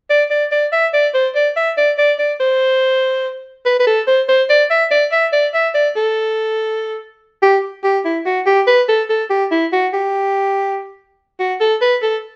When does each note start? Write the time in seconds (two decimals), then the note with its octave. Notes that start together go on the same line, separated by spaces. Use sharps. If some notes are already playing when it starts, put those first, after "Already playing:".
0.10 D5
0.30 D5
0.52 D5
0.72 E5
0.93 D5
1.14 C5
1.35 D5
1.57 E5
1.77 D5
1.98 D5
2.19 D5
2.40 C5
3.65 B4
3.80 B4
3.87 A4
4.07 C5
4.29 C5
4.49 D5
4.70 E5
4.91 D5
5.12 E5
5.33 D5
5.54 E5
5.75 D5
5.96 A4
7.43 G4
7.84 G4
8.05 E4
8.26 F#4
8.46 G4
8.67 B4
8.89 A4
9.10 A4
9.30 G4
9.51 E4
9.72 F#4
9.93 G4
11.40 F#4
11.61 A4
11.82 B4
12.03 A4